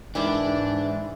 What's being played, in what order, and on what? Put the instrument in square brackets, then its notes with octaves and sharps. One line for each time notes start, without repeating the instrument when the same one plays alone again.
[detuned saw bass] G#2 [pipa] D#3 E4 G4 [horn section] E3 [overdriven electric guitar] D4